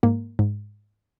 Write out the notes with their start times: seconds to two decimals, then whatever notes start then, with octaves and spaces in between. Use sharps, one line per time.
0.03 G#2 A#3
0.39 G#2